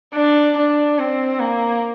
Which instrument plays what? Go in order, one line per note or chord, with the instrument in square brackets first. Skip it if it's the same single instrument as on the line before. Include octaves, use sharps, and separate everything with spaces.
[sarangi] D4
D4
C4
A#3